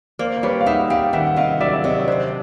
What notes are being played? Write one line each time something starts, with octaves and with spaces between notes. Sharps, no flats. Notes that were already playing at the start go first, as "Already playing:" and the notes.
A#3 C5 D5
C5
G3 B4 C#5
F5
D#4 E5 F#5
G3 F5 G5
D#3 E5 F#5
F#5
C3 D#5 F5
F#3 D5 E5
E5
C3 C#5 D#5
D#5
D4 C5 D5